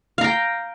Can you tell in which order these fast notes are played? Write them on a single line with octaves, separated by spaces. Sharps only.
F5 A#5 G5